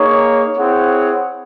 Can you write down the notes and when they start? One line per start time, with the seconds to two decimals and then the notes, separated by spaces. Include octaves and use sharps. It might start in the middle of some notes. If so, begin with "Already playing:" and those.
Already playing: A#3 D#4 G#4 C#5
0.57 C4 E4 G#4 C#5 F#5